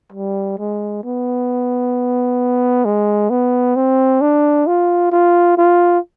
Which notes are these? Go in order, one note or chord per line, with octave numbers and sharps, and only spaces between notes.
G3
G#3
B3
G#3
B3
C4
D4
F4
F4
F4